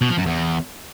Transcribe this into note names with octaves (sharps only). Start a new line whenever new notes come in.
B2
F3
F#2
E2